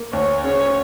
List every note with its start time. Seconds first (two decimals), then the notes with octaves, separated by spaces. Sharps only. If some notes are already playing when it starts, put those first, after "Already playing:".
Already playing: A#3
0.12 D2 C#5
0.44 C#3 C#5